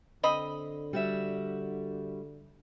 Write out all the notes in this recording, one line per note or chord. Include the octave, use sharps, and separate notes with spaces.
D3 C4 D#5 B5
G3 F#4 E5